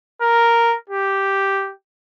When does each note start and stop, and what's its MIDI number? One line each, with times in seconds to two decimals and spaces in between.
0.22 0.76 70
0.90 1.72 67